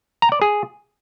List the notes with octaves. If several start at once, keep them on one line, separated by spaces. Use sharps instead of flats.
A#5
D5
G#4